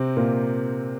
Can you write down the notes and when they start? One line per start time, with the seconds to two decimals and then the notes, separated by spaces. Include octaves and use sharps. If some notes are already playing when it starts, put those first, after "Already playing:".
Already playing: C3 C4
0.17 A#2 A#3